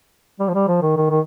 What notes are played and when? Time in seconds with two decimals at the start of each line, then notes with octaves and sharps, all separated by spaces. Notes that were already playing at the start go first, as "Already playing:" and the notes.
0.40 G3
0.49 F3
0.54 G3
0.68 F3
0.82 D#3
0.97 D#3
1.10 D#3